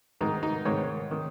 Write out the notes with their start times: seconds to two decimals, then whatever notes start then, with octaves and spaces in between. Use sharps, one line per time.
0.21 G#2 D#3 D#4
0.43 D#4
0.65 G#2 D#3 C#5
1.11 D#3